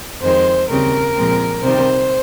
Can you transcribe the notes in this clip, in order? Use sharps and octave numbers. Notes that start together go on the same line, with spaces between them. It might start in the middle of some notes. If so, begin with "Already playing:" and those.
F2 D#3 G#3 C5
D#2 C#3 G3 C4 A#4
A#2 F3 G#3 C4
C3 D#3 G3 C5